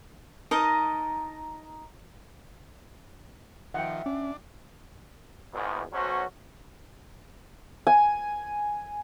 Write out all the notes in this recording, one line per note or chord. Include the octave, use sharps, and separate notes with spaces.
D#4 A#4 D#5 A5
D#3 F3 E5 F#5 G5
C#4 D4
G#1 E2
B1 B2 F#3 C#4 F#4 C5
G#5